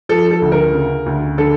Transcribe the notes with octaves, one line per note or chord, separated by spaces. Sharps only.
F3 A4
A4
D2
A#4
C#3
D2
D3 A4